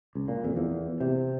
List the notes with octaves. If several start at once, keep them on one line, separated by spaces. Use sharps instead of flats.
C#2
A#2
F2
E2
C3